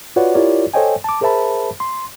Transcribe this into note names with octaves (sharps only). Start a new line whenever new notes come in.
F4 F#4 B4 C#5 D5 F#5
E4 F4 G4 A#4 C#5 D5
A4 C5 C#5 D#5 G5 G#5
A5 D6
G#4 A#4 C5 E5 A5 B5
C6